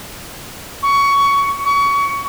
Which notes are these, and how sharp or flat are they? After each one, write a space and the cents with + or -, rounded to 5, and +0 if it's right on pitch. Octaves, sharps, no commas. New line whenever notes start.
C#6 +15
C#6 +25